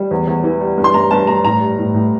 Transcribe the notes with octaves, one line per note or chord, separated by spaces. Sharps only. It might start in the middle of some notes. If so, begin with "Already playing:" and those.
Already playing: G3
E2
E2
E3
G3
G2
C6
G2 A#5
G2 A5
G2 A#5
A2 A#5
G3
A2
A2